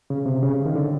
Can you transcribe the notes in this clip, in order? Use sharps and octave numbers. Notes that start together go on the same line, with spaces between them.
C#3
C3
C#3
D#3
D3